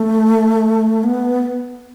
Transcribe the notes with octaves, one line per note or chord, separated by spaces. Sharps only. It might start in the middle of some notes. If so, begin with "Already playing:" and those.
Already playing: A3
B3